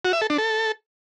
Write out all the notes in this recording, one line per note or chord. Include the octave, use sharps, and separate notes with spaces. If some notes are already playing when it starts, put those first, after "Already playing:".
F#4
E5
A4
D4
A4